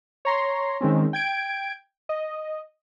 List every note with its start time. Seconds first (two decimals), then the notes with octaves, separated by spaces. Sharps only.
0.25 C#5 A#5 C6
0.81 D#3 G#3 C4 C#4
1.13 G5 G#6 D7
2.09 D#5